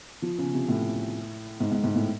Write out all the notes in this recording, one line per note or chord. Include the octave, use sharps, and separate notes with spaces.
F3
C#3
C3
A2
G#2
G#2
G#2
A2